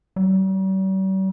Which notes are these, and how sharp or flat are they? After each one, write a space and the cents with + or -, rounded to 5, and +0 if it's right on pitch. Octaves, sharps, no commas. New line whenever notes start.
G3 -45